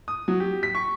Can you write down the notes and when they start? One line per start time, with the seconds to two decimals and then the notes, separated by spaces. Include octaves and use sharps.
0.08 D#6
0.28 F#3
0.40 G4
0.63 B6
0.75 C#6